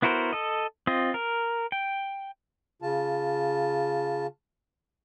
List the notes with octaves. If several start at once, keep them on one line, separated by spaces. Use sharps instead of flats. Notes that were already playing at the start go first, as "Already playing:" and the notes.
B3 E4 F#4 A#4 C5
A4 D#5
C4 F4 D#5
A#4
G5
C#3 F4 A5